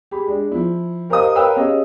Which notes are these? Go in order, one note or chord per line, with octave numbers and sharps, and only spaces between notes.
G4 G#4 B5
G#3 D4
F3 E4
G4 A#4 C5 D#5 F5 D#6
A#4 B4 C#5 F5 G5 E6
C#4 G4 G#4 D#5 F5